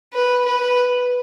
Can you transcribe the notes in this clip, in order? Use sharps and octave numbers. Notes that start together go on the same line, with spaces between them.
B4
B4